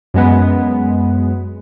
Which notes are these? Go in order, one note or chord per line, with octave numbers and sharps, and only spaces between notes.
F#2 G#3 B3